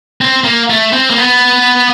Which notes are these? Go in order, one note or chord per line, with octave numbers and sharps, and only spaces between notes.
C4
A#3
A3
C4
A#3
B3